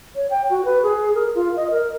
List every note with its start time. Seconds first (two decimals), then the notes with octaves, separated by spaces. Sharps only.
0.15 C#5
0.30 G5
0.50 F#4
0.65 B4
0.83 G#4
1.14 A#4
1.35 F4
1.56 D#5
1.71 A#4